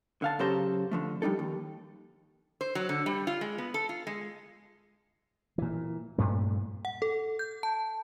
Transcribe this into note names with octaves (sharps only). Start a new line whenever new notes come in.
D3 F5 A5
F#2 C#3 G4 A4 C5 A#5
D3 F3 A3
G3 D4 D#4 A4
D#2
C5
F#3
D3
G3
F4
G#3
B3
A4
F4
G#3
A#2 E3
G2 A#2 A3
F#5
A4
G6
A5